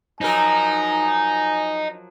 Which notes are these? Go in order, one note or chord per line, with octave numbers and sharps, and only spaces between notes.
F3 F#3 D#4 A#4 G#5